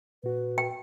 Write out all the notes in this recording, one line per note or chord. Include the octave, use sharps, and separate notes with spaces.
A#2 F#4 B4
G5